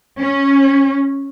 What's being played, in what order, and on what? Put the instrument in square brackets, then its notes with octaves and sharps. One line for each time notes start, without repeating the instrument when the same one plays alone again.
[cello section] C#4